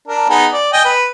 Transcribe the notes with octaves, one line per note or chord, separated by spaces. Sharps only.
D4 A#4
B3 D#4 G#4
D5
D#5 G5 G#5
B4